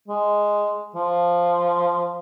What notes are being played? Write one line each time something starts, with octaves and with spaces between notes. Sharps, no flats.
G#3
F3